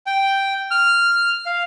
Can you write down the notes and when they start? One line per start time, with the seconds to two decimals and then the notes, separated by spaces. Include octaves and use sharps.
0.06 G5
0.71 F6
1.46 F5